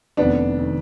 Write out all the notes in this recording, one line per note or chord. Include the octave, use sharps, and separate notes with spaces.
F1 F2 D#3 B3 D4
D#3